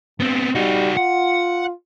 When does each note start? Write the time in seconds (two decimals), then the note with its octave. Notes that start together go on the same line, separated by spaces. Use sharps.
0.20 G2 B3 C4
0.55 G3 D#4 F#4
0.97 F4 F#5